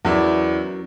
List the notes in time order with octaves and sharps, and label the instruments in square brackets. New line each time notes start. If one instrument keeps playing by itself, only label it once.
[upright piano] E2 E4 D5 [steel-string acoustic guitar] F#3 C#4 A#4